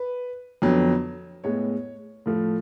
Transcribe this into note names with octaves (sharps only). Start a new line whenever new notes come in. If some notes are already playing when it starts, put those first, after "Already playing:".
Already playing: B4
F2 D3 F#3 B3
A2 G#3 B3 C#5
A2 F3 A3